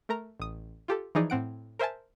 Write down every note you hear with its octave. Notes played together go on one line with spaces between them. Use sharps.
A3 A#4 A#5
A1 D#6
F4 G4 A4
E3 F3 D#4 G#4 D5
A2 C4 F#5 D7
A#4 C5 E5 G#5 A5